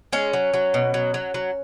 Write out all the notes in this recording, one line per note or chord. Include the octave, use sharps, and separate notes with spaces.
G#3 C#4
F#3
F#3
B2
F#3
F#3
F#3